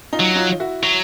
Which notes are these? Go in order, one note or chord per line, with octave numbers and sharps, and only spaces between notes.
D#4 F4
F#3
D#4 F4
E4 F#4
F#3